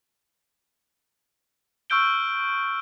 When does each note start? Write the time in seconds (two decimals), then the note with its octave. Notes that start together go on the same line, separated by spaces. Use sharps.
1.90 C#6 E6 F6 G6 D7 G7